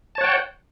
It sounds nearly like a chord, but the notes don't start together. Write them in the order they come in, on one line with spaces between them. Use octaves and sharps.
A5 C#5 F#5 G5